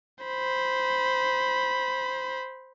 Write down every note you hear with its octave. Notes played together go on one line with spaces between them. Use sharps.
C5 B5